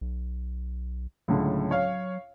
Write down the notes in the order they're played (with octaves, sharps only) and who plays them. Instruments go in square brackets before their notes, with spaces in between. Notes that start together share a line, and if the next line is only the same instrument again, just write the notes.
[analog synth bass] B1
[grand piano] C#2 A2 D3 [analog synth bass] F#3
[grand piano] C#5 F5